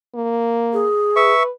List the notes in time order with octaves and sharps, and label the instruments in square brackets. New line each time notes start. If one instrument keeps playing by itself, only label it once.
[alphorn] A#3
[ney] G#4
[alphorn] B4 [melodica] E5 C#6